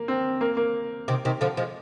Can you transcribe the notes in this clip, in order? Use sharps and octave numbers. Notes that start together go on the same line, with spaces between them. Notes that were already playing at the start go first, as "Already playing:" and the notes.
Already playing: A#3
C4
A#3
A#3
C3 D#3
C3 D#3
D3 F3
F3 G#3